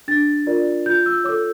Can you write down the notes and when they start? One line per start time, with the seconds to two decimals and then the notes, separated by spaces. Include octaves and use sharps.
0.08 D4 A6
0.46 F4 A#4 D5
0.86 F4 G6
1.06 E6
1.24 A4 C#5 D6